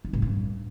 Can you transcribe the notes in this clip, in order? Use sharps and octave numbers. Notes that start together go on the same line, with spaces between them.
D#3
A2
G2